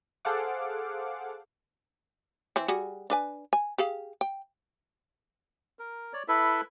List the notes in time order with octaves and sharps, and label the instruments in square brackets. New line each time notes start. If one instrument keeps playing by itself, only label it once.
[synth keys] G#4 A4 C5 F5 F#5 D6
[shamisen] E3 C4
G3 F#4 G#4
D4 B4 G#5
G#5
G4 G#4 F5
G5
[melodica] A#4
C#5 D5
E4 A4 B4 E5